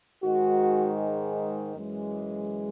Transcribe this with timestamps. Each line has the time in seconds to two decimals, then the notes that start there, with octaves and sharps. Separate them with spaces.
0.23 G#2 D#3 G#3 F#4
1.75 F#2 E3 G#3